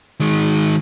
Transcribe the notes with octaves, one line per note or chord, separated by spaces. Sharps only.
D#3 G#3